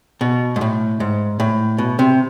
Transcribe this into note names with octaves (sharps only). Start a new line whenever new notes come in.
B2
G#2
A2
G#2
A2
B2
C3